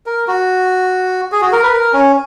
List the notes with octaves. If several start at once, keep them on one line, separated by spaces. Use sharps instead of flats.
A#4
F#4
G#4
F#4
A#4
B4
A#4
C#4